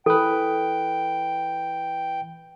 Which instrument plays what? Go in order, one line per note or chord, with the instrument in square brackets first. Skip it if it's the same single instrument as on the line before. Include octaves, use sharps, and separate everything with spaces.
[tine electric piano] E3 B4 [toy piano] A4 [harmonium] G5